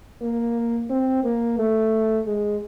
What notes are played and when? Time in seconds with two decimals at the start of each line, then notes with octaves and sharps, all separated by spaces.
0.22 A#3
0.90 C4
1.24 A#3
1.59 A3
2.26 G#3